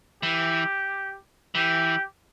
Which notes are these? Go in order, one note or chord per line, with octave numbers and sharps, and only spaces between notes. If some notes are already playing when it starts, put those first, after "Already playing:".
E3 G4
E3 G4